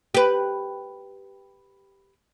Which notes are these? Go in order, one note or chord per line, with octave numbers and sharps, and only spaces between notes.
G4 B4